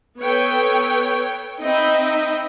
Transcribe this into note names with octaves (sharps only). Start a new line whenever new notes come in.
B3 A4 B4 C#5 G5
C4 D#4 D#5 E5 G5 B5